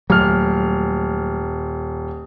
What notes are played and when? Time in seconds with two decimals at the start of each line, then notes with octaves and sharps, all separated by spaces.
0.10 D#1 F#3 A3 F6